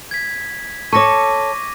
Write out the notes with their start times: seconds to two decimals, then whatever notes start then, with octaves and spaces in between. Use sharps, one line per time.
0.11 G#6 B6
0.93 A4 C#5 C#6 D6 A#6 D#7